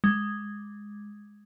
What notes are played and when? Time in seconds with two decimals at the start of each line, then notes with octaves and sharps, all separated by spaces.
0.04 G#3